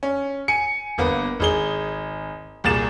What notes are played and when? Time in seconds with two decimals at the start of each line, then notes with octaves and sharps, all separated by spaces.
0.03 C#4
0.48 G#5 C#7
0.98 G1 A#3 B3
1.40 G#1 G#4 G7
2.64 C2 A#2 G#4 A6 E7